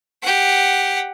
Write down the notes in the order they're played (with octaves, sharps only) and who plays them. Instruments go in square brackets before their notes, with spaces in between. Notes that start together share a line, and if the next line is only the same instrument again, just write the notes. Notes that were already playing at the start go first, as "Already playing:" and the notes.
[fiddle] G4 F#5